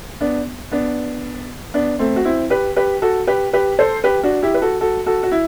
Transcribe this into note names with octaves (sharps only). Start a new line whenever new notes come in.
B3 D4
B3 D4
B3 D4
A3 C4
F#4
C4 E4
G4 B4
G4 B4
F#4 A4
G4 B4
G4 B4
A4 C5
G4 B4
D4 F#4
E4 G4
B4
F#4 A4
F#4 A4
F#4 A4
F#4
E4